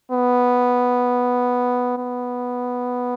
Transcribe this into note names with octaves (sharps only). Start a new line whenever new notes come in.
B3
B3